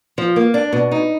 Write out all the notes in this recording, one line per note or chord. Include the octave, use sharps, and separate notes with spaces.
F3
A#3
D4
B2
D#4